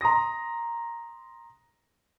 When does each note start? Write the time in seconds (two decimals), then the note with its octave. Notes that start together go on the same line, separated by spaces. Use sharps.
0.01 A#5 C6 D#6 A#6